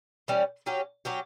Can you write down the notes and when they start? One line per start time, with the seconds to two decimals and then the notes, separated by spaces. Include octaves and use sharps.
0.28 E3 G3 C#4
0.66 F#3 C#4 G4
1.05 F#3 C#4 G4